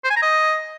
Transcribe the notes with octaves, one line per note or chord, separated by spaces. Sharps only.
C5
G#5
A#5
D#5